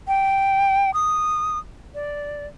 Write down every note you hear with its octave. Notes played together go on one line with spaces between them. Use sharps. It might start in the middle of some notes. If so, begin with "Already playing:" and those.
G5
D#6
D5